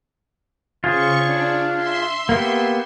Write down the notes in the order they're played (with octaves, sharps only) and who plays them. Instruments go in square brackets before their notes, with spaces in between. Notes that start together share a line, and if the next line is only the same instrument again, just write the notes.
[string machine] C#3 C#6 [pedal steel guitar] F4 G#4 C5
[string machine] D4
E5 C6
[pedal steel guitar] A#3 B3 G4